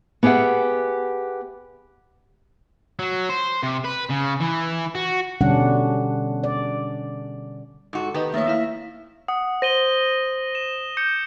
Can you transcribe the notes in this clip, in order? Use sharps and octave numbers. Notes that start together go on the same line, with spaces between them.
B3 G4 G#4 E5 F#5
F#3
C5
C3
B4
C#3
E3
F#4
B2 D3 G3 C#4 D4 F#5
D5
G#2 F#4 A4
D#3 B3 G4 A4 B4 D#5
D#3 F3 A3 A#3 C#5 E5
A#3 E4 F5
F#5 D#6
C5 A#6 D#7 G7
E7
D6 G6 C#7